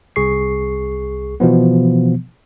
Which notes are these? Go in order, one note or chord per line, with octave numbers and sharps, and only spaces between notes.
C2 G#4 C#6 C7
B2 E3 F3 B3